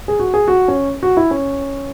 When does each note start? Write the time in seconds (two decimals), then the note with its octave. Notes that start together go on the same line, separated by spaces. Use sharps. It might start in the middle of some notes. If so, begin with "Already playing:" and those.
0.08 G#4
0.20 F#4
0.34 G#4
0.48 F#4
0.68 C#4
1.03 F#4
1.17 E4
1.31 C#4